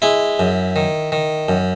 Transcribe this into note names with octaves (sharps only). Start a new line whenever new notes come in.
G#3 E4
F#2
D#3
D#3
F#2